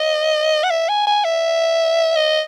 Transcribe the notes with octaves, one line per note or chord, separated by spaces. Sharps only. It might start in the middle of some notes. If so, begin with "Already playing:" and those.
Already playing: D#5
F#5
E5
G#5
G#5
E5
D#5